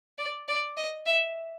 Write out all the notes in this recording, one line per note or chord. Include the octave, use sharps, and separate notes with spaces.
D5
D5
D#5
E5